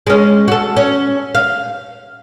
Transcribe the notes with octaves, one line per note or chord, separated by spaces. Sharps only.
G#3 C#4
F#4 A4
C#4
F5